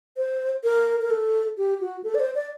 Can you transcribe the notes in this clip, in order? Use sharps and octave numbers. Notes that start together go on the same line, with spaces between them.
C5
A#4
A#4
A4
G4
F#4
A4
D5
C5
D5